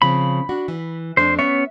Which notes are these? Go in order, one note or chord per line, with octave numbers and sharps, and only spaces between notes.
C#3 F3 C4 B5
D4 F#4
E3
F2 A3 D4 C5
B3 C#4 C#5 E5